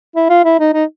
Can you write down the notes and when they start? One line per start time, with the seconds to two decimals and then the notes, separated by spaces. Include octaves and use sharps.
0.16 E4
0.30 F4
0.45 E4
0.60 D#4
0.74 D#4